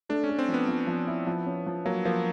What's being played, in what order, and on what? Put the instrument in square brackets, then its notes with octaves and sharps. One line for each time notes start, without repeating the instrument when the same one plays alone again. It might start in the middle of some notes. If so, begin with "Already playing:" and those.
[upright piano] A3 [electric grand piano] D4
[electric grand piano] C#4
[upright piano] A3
[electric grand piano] C4
[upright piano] F3
[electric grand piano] B3
[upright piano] F3
F3
E4
F3
C#4
F3
[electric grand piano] F#3 [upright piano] A#3
[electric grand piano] F3 [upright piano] A#3